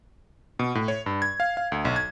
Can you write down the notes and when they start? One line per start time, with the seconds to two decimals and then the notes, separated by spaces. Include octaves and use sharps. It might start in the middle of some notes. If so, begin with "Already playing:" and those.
0.59 B2
0.75 A2
0.88 C#5
1.06 G2
1.22 G#6
1.40 F5
1.57 F5
1.72 D2
1.85 B1
1.96 G#6